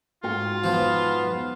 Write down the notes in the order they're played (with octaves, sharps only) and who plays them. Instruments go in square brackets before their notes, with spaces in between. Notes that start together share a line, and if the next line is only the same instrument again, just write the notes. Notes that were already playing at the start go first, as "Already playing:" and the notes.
[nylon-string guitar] G#2 F#4 G5 [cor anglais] F4
[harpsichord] F3 [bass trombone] B3